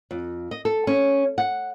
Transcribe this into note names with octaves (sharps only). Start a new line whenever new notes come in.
F2
D#5
A4
C#4
F#5